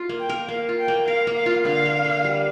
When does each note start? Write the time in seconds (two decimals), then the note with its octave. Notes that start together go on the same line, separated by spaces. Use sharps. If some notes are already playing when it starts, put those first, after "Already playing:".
Already playing: F4
0.09 A#3
0.20 G5
0.29 A#4
0.49 A#3 F5
0.69 F4
0.79 G5
0.88 A#3
1.07 A#4 F5
1.27 A#3
1.36 F5
1.46 F4
1.65 D3 F5
1.86 A#3
2.04 D3
2.24 G3